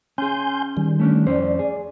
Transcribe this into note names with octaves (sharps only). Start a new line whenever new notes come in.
C#4 G#4 G#5 C6 G6
D#3 G3
A3 C#4 D4
F2 C#4 C5 D5
G#4